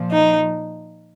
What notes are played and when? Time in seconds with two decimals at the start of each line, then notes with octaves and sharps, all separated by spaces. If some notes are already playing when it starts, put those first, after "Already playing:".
Already playing: A#2 F3
0.11 D#4